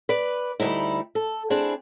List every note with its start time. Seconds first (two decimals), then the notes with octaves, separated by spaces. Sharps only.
0.09 B4 D5
0.60 D2 G2 G3 D#4 E4
1.15 A4
1.50 C4 D4 E4 G#4